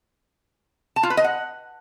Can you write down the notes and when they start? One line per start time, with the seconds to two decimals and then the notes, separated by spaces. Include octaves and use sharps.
0.96 A5
1.03 F4
1.10 B4
1.17 D#5
1.24 F#5